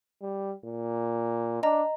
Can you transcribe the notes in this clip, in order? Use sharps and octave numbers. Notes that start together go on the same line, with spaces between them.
G3
A#2
D4 D#5 A#5